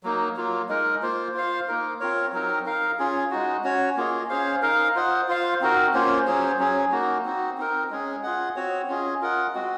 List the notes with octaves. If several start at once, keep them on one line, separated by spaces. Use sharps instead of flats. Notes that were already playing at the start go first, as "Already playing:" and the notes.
F#3 A#3 D#4
F#3 A#3 F4
G#3 D#4 A#4
A#3 F4 C5
F4 C5 F5
A#3 D#4 A#4
C4 F4 A#4 C#5
F#3 C4 D#4 A#4
D#4 A#4 F5
C#4 F4 G#4
G#3 D#4 F#4
C#4 F#4 C#5
A#3 F4 G#4 D#5
C#4 G#4 C5 F5
D#4 A#4 F5
F4 C5 D#5 F#5
F4 C5 F5
C4 D#4 F#4 A#4
A#3 C#4 F4 C5
F#3 C#4 G#4 C5
F#3 C#4 G#4
A#3 D#4 F#4
C4 D#4 F#4
C4 D#4 A#4
G#3 C#4 G#4
F4 G#4 D#5 F#5
C4 F#4 C#5
C#4 F4 G#4 D#5
F4 A#4 D#5 F#5
G#3 C4 F#4